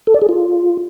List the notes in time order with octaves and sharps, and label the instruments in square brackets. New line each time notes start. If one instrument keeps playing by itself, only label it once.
[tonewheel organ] A4
D5
G#4
F4